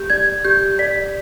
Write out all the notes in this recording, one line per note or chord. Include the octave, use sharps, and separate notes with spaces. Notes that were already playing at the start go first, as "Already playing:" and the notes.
Already playing: G4 G6
D5 G#6
G4 G6
D5 B6